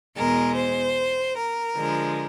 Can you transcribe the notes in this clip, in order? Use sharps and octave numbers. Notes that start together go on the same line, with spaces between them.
E2 B2 G#3 A#4
C5
A#4
D3 F3 G#3